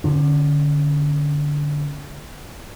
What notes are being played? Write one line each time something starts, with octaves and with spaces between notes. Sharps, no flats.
D3 C#4